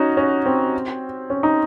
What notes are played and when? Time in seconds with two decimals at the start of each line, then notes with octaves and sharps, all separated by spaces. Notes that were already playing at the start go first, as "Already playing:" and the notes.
Already playing: C#4 D#4 F#4
0.17 C#4
0.46 C4
1.30 C#4
1.43 D#4